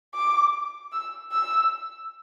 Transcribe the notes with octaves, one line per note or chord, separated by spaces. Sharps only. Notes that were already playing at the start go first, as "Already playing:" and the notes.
D6
E6
E6